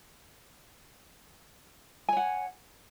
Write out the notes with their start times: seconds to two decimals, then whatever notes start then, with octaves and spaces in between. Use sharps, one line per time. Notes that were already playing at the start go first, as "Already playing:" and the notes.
2.09 G#5
2.13 C#5
2.17 F#5